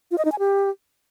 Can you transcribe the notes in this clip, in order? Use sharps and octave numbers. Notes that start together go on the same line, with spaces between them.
F4
D#5
D#4
G#5
G4